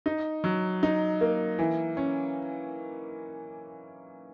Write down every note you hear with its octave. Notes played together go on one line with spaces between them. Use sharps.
D#4
F#3
D#4
A#3
E3
C#4